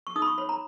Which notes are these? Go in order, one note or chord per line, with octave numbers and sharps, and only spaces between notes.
C#6
D#4 D#6
B5
C#6
C#5 B5
A#5